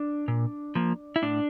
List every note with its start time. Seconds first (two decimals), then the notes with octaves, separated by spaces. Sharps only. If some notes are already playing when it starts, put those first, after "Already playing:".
Already playing: D4
0.28 A#2
0.75 F3 A#3
1.16 E4
1.22 A2 D4